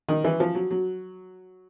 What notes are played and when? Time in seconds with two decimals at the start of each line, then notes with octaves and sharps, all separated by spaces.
0.09 D#3
0.24 E3
0.40 F3
0.55 F#3
0.71 F#3